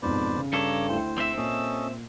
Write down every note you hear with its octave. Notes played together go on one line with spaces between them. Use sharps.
F2 G#2 B2 B4 C5 D5
C#3
G2 A4 C#5 A#5 D6
D2 E4 C5 G5
C4 E5
A#2 C#4 A4 D#5